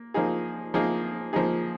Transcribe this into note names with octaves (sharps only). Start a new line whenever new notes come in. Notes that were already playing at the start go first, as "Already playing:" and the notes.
Already playing: A#3
F3 A#3 D#4 G#4
F3 A#3 D#4 G#4
F3 A#3 D#4 G#4